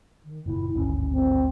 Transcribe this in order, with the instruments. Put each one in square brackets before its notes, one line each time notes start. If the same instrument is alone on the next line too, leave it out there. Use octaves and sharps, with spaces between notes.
[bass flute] D#3
[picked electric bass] F#1 A#2 [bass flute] E4
[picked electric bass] G#1 D2 G2 [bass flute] C#4
[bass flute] C4